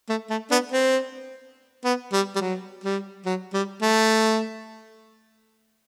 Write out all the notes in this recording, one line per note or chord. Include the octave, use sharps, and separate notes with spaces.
A3
A3
B3 D4
C4
B3
G3
G3
F#3
G3
F#3
G3
A3